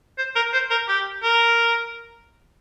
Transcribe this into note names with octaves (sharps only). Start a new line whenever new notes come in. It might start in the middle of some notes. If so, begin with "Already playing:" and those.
C5
A#4
C5
A#4
G4
A#4